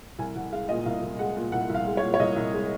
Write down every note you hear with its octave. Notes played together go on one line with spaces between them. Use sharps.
C2 G#5
C2 F#5
G#3 F5
A#2 D#5
C2 F5
C2
G#3 F#5
A#2
C2 F#5
C2
F5
G#3
C#5
A#2
C#5
C2 D#5
C2
G#3